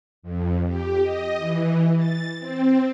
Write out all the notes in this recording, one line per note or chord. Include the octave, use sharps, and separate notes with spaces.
F2
G4
D#5
E3
A6
C4